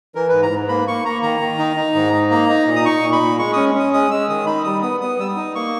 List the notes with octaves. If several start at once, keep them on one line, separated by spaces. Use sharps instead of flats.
E3 A#4
G#2 B4
A#5
G#2
A#3 B5
A#3 C#6
A#3 A#5
D#3 A#5
D#3
D#4
D#4
G#2
D#4
A#3 A#5
D#4
A#2
D#6
D#4 C#6
A#2
B5
A#2
G#3 C#6
C#4 D#6
C#4 D#6
G#3 D#6
G#3 E6
D#3 D#6
D#4 B5
G3 D#6
B3 D#6
B3 D#6
G3 E6
D#6
D#4
A#3 C#6